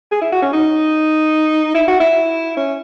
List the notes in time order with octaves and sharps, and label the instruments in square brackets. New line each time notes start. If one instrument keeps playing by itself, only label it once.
[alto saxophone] G#4
E4
F#4
C#4
D#4
E4
F#4
E4
C#4